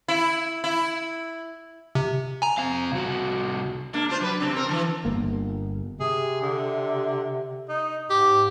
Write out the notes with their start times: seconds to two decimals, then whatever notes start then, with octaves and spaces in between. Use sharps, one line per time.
0.08 E4
0.64 E4
1.95 C3
2.42 G#5 A#5
2.58 C4 F5
2.92 C2 F#4
3.93 G#3 A#3 D4
4.09 D4 F4 C5
4.21 F#3 B4
4.40 C3 C4 D4
4.53 C4 A#4
4.67 E3 F3 D4
5.05 G1 A#3
6.00 C3 G#4
6.41 D3
7.69 D#4
8.10 G#2 G4